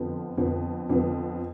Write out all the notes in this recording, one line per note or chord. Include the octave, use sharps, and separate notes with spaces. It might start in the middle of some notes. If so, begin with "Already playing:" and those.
Already playing: F2 D3 F3 B3
F2 D3 F3 B3
F2 D3 F3 B3